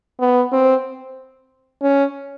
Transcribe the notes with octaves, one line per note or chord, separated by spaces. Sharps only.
B3
C4
C#4